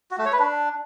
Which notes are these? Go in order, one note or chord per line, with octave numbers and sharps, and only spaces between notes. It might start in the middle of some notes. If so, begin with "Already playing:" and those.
F#4
A3
C#5
B4
D4